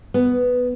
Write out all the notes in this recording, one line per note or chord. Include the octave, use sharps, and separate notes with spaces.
B3